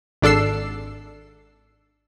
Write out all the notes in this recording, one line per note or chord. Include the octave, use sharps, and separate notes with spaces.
G#1 D4 A4 E6 C7